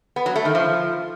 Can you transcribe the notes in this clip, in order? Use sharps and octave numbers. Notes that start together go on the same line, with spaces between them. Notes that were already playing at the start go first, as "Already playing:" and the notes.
B3
F#3
A3
D#3
F3